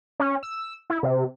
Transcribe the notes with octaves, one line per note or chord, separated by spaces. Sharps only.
C#4
E6
E4
C3